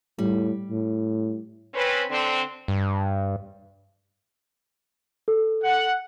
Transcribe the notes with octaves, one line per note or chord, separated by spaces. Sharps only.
A2 G3
A2
C4 C#4 B4
D3 C4
G2
A4
F#5